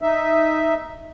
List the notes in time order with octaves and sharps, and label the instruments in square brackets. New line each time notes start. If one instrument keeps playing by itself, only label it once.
[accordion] D#4 E5